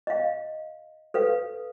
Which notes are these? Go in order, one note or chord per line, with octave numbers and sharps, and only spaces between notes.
D#5 F5
A4 B4 F5